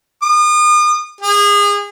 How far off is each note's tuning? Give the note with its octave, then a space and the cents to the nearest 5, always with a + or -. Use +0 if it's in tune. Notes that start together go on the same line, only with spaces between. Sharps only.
D#6 -40
G#4 -30